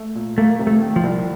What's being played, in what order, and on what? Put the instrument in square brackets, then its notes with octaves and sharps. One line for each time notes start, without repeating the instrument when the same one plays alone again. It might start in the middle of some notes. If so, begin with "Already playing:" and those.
Already playing: [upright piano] A3
A#2
[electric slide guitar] A3 [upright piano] A#3
[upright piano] C3
[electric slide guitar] A3
[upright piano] D#3
[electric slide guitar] F3
[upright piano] C2